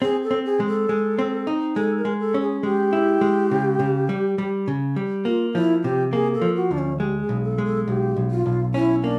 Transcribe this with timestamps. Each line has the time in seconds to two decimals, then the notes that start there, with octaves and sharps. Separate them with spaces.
0.01 C4 G#4
0.23 A4
0.31 C4
0.45 G#4
0.60 G#3
0.67 A4
0.89 G#3
1.19 C4
1.47 D#4
1.76 G#3 A4
1.98 A#4
2.05 G#3
2.20 A4
2.34 C#4
2.42 G#4
2.63 G#3 G4
2.93 E4
3.21 G#3
3.51 C#3
3.80 C#3
4.09 G3
4.38 G3
4.68 C#3
4.96 G3
5.25 A#3 F4
5.55 F3 E4
5.83 C3 G4
6.13 A#3 G#4
6.34 A4
6.42 F3
6.56 F#4
6.71 D2 D4
6.78 C#4
7.00 G#3 G4
7.22 G#4
7.29 B1
7.44 A4
7.58 G#3
7.65 A4
7.87 B1 G4
8.17 B1
8.31 F4
8.46 B1
8.74 C#4 E4
9.04 A#3 D4